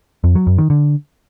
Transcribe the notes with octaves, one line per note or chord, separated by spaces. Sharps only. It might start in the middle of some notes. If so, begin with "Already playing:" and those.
F2
F#3
F#2
D#3
D3